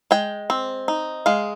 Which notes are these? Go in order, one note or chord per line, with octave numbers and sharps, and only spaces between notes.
G#3 G5
C4
D#4
G#3 F5